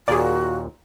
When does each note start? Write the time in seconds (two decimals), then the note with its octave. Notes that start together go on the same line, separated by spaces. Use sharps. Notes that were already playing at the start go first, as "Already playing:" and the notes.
0.08 D#2 A#2 F#4 G#4 D5